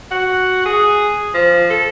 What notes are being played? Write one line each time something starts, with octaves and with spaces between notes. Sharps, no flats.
F#4
G#4
F3
A4